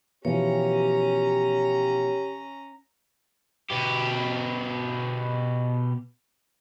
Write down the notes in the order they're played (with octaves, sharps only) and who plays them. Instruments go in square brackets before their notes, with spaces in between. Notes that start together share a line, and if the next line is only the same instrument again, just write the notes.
[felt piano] B2 E3 F3 [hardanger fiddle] C#4 A#5 [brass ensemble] G4 [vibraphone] C#5
[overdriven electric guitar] B2 G4